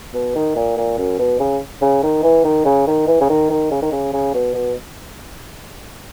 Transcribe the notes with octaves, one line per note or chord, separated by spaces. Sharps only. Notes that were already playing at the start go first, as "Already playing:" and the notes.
B2
D#3
A#2
A#2
F#2
B2
C#3
C#3
D#3
E3
D#3
C#3
D#3
E3
C#3
D#3
D#3
C#3
D#3
C#3
C#3
B2
B2